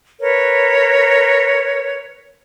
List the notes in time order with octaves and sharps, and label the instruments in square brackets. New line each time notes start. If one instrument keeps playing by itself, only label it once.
[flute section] A#4 B4 C#5